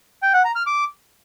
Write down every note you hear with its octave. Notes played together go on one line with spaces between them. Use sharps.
G5
F#5
A#5
F6
D6